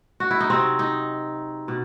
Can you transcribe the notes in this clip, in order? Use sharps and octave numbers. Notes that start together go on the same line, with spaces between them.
F#4
E4
D#4
C3 F#3 C4
D#4
B2